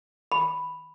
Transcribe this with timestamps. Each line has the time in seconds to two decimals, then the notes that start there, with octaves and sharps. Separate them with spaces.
0.32 B5